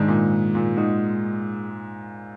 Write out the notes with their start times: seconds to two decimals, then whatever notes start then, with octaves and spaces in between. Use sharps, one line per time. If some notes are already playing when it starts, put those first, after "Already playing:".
Already playing: G#2 D#3 G#3 D4
0.08 A#2
0.55 A#2
0.77 G#3 D#4 F#4